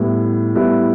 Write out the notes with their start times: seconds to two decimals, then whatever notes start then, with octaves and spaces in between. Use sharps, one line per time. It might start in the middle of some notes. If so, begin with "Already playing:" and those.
Already playing: A2 G3 B3 E4
0.55 A2 G3 B3 E4